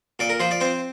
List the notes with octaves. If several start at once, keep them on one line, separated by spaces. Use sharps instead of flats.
A#2 D5
A#4
F3 C5
D5
C4 C5